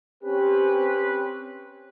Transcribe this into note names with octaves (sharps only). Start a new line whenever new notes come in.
C4 C#4 G4 B4